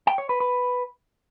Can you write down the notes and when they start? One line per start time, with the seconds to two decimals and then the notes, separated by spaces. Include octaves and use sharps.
0.07 G5
0.18 C#5
0.29 B4
0.40 B4